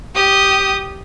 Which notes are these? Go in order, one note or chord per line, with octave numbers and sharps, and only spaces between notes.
G4 D#6